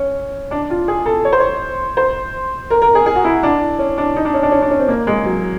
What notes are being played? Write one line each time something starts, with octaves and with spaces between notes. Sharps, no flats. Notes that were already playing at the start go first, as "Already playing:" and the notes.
Already playing: C#4
D4
F4
G#4
A4
C#5
C5
C#5
C5
A#4
A#4
G#4
G#4
F#4
E4
D4
C#4
D4
D#4
D4
C#4
D4
C#4
D4
C#4
C4
A#3
G#3
F#3